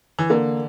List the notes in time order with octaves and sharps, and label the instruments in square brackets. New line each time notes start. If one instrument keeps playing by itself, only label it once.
[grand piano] E3
[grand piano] D3 [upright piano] A#3